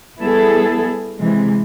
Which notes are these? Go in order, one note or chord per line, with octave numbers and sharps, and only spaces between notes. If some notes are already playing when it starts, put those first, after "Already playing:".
G3 B3 E4 G#4 A4
C3 E3 G#3